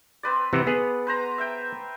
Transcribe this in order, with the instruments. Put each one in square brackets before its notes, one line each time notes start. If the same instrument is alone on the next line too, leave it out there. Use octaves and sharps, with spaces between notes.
[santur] C4 B4 D5
[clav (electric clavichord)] C3 E3 [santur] F#5 B5
[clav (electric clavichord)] B3 G#4
[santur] B4 C5 A#5
E5 G5